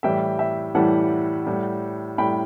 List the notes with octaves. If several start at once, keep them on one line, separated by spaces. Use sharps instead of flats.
A2 E3 G3 E5 G5
E5 G5
A2 E3 G3 F#5 A5
A2 G3
A2 G3 G5 B5